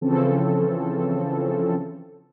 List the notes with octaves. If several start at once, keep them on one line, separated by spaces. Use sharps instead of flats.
C#3 E3 F3 C4 C#4 A4